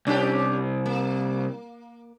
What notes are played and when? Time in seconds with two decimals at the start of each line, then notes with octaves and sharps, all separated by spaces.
0.07 C2 C#4 D4 G4
0.86 A#3